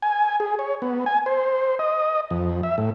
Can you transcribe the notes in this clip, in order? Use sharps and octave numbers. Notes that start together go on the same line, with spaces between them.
G#5
G#4
C#5
B3
G#5
C5
D#5
F2
E5
A2